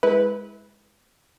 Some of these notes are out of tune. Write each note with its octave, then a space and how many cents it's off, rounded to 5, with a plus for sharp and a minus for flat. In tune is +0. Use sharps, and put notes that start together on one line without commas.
G#3 -10 E4 -20 B4 +0